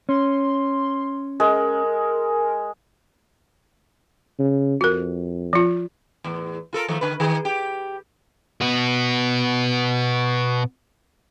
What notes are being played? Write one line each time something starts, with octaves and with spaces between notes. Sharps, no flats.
C#4 C6
G#3 A#4
C#3
F2 F#4 A#4
F3 F4
E2 A2
F4 A4 A#4
D#3 F3 A3
D3 B4
D#3 G#4
G4
B2 B3